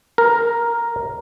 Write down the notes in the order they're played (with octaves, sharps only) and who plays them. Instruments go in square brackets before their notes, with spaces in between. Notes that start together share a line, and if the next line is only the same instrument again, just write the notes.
[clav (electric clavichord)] A#4